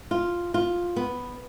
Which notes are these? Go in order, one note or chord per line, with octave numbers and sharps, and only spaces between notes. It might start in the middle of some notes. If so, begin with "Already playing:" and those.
F4
F4
B3